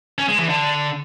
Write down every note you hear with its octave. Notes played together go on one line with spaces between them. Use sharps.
C#4
G#3
E3
D3